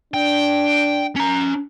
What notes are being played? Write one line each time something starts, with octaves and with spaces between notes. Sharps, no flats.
D4 G5
C#4 A#5